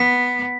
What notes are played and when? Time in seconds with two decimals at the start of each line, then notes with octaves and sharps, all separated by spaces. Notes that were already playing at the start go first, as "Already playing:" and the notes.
Already playing: B3 B6